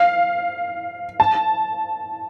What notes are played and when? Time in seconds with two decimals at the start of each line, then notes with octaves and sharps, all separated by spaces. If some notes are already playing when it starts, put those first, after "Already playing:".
Already playing: F5
1.20 A5